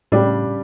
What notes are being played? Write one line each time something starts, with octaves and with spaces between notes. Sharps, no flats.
A2 C#3 G3 D4 G4